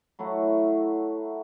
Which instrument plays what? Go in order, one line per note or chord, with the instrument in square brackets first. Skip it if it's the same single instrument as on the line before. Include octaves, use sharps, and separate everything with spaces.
[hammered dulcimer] F#3 A3 E4 F#4